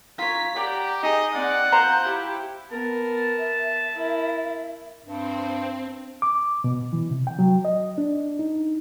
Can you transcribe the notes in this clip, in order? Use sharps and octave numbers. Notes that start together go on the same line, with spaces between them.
F4 C#5 A#5 B6
G4 D5 F#5 A#5
D#4 G#4 D#5
C4 D5 F#5
F4 C5 A#5 G6
E4 G4
B3 A#4 A5
E5
E4 A#4
G2 C4
D6
B2
E3
C3
G5
F#3
D#5
D4
D#4